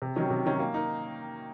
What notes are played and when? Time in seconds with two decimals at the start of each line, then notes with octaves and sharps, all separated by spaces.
0.02 C3
0.16 D#3 F#3 C#4
0.30 C3
0.46 D#3 F#3 C#4
0.59 A#3
0.74 D#4 A#4